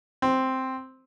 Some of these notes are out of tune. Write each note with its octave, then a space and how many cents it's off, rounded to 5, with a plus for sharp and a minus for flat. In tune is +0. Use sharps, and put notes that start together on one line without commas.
C4 +0